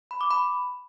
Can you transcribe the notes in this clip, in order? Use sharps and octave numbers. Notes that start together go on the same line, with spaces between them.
B5
D6
B5